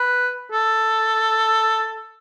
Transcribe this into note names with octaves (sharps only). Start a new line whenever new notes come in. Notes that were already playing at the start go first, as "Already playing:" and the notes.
Already playing: B4
A4